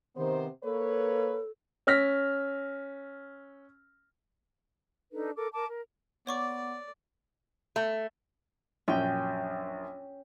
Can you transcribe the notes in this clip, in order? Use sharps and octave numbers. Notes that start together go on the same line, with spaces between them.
C3 D#3 B3 C5
A#3 A4 B4 C#5
C#4 E6 F6 A#6 B6
D4 D#4 A4 B4
A4 A#4 D6
A#4 A5 D6
A#4
B3 C#5 D5 C#6 D6
A3
A#1 F#2 C#4 G5